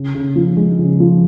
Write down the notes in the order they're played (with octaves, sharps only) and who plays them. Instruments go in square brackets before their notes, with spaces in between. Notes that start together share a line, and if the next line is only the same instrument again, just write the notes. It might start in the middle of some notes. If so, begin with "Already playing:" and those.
Already playing: [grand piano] C#3
C#3
F3
G#3
C#3
F3